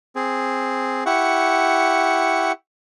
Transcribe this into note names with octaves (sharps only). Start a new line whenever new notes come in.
C4 G#4
E4 G4 F#5 C#6